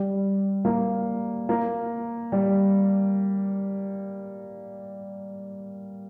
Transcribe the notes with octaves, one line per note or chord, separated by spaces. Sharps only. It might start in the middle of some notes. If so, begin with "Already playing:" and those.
Already playing: G3
A#3
A#3
G3